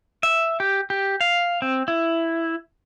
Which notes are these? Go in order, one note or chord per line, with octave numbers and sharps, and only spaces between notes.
E5
G4
G4
F5
C4
E4